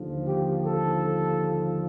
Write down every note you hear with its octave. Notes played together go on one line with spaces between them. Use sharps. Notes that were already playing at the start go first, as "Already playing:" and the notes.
Already playing: D#2 D3 F3
G4
A4